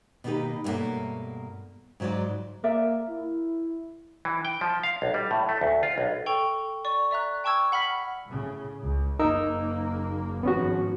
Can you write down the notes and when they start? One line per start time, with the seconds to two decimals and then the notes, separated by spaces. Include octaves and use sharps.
0.24 B2 D#3 A#3 D#4 G4 B4
0.64 G2 B2 D#3 A3 A#3 C#5
2.00 G#2 C#3 F#3 F4 D5
2.64 A#3 A#4 D5 E5
3.09 E4
4.25 E3
4.45 G5
4.61 F3
4.83 F5
5.02 B1
5.14 G3
5.31 A2
5.49 A3
5.61 D2
5.83 F4
5.98 B1
6.26 A4 G5 C#6 F7
6.85 D5 C#6
7.11 D5 E5 A#5 F#6
7.44 G5 A5 C#6 E6 G#6
7.72 F#5 B5 F6 B6
8.25 A2 C#3
8.82 C#2
9.19 F#1 A#3 D#4 A#4 E6
10.43 G#1 F3 B3 C#4 F#4